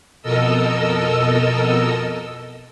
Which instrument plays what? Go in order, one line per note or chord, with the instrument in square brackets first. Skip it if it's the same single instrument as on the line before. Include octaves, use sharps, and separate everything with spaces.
[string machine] F2 B2 A4 A#4 D#5 E6